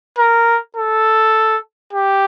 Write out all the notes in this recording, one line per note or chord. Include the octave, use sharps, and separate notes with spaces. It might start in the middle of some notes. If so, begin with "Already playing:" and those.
A#4
A4
G4